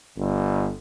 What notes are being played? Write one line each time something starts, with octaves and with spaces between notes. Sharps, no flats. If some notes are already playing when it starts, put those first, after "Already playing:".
G1